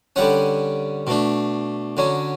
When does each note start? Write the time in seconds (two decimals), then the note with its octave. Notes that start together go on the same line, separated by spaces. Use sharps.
0.16 D3 G3 C#4 F#5
1.07 B2 A3 D4
1.97 D3 F#3 C#4